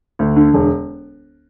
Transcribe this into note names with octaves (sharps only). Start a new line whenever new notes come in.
D2
D3
E1